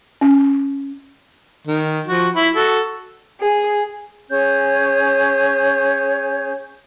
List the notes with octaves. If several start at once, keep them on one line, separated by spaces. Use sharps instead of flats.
C#4
D#3
F3 F#4
E4 B5
F#4 A4
G#4
C#4 G#4 C#5 G6